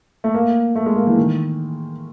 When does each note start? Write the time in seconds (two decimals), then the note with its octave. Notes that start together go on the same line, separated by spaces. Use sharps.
0.24 A3
0.34 A#3
0.76 A3
0.86 G#3
0.96 A#3
1.07 E3
1.17 D#3